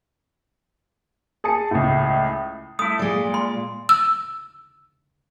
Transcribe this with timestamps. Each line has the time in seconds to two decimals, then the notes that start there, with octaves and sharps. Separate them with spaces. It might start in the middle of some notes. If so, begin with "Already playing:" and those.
1.44 G#4 A5 D#6 C#7
1.71 C#2 A2
2.79 A3 E4 D#6
2.99 A#2 G#3 D5
3.34 C6
3.89 E6